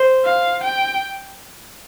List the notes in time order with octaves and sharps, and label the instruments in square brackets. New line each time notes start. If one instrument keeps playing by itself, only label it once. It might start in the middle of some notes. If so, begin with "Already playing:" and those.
Already playing: [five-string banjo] C5
[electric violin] F5
G5